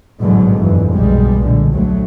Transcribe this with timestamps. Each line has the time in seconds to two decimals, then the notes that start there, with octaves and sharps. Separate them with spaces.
0.21 A1 E2 G#2 B2 D3 F#3
0.57 G1 F2 E3
0.93 B1 B2 G3 G#3
1.41 A#2 D3
1.72 D2 F#3 A3